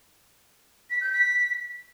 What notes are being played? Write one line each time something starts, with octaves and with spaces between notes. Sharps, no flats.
B6
G6
B6